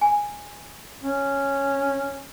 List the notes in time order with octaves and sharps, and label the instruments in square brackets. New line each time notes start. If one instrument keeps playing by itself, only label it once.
[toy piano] G#5
[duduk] C#4